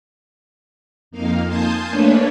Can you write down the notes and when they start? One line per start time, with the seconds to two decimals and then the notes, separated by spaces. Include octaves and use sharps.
1.11 F2 A#3 D#4 F5
1.46 G#5 A5 C6 D#6 G6
1.88 A3 A#3 D4 B4 C#5